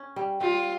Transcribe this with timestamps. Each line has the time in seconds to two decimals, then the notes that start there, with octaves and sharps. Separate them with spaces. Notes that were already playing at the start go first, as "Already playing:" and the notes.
Already playing: C#4
0.16 G3
0.41 G3 F4